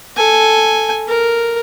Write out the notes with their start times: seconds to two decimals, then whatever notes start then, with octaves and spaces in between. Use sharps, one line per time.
0.17 A4 G#5
1.08 A#4